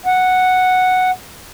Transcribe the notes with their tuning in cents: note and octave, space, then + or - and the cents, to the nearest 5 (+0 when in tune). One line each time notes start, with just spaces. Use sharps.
F#5 +0